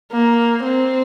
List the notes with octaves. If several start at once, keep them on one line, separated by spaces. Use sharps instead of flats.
A#3
C4